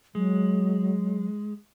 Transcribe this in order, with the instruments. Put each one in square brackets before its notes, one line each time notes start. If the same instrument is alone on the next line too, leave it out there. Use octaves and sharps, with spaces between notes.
[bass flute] F#3 [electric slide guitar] G#3